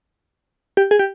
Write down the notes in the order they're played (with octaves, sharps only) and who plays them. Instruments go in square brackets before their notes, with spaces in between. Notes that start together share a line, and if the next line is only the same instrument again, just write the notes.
[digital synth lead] G4
G#4
G4